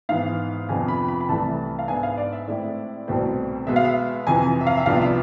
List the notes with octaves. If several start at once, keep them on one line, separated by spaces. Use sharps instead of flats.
G#2 E3 B3 F5
F2 C3 F3 B3 D4 G#5
B5
B5
B5
C2 C3 E3 A3 A5
F5
G#2 G#3 B3 D4 G#5
F5
D5
E5
A2 G#3 C4 E4 D5
C2 B2 A3 C4 E4
B2 G#3 B3 E5
F5
E5
F2 C3 E3 G#5
E5
F5
E5
C2 C3 F3 B3 D4 F5
E5